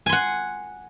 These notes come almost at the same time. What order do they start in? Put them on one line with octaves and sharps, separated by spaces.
G#5 C6 F#5